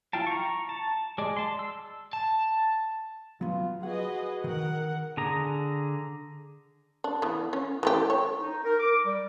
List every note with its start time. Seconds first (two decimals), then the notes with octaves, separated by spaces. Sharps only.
0.13 E4 F4 F5 G5 A5
0.26 A#5 C#6
0.69 A5
1.18 G#3 D5
1.37 A5 C6
1.59 E6
2.13 A5
3.41 F#3 B3 F4
3.83 F#4 G#4 B4 D#5 F#5
4.44 D#3 A#4 F#5
5.17 D3 G#4 A#5
7.04 D4
7.22 E3 B3
7.53 C#4
7.83 E3 A3 G4
8.10 C#5
8.40 D#4
8.63 A#4
8.79 D6
9.05 G3